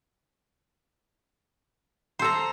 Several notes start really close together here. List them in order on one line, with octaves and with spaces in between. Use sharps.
C5 A4 A#5